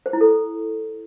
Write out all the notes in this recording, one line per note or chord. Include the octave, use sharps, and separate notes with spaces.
C5
E4
A4